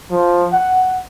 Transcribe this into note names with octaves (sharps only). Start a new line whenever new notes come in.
F3
F#5